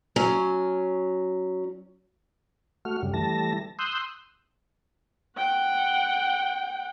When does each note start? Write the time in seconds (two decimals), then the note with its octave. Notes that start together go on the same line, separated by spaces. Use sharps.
0.16 F#3 C#4
2.85 A3 F#4 F6
3.02 F#2 C#3 G3
3.14 E3 G3 A3 A5 A#6
3.79 C6 D#6 E6 F#6 G6
5.38 F#5 G5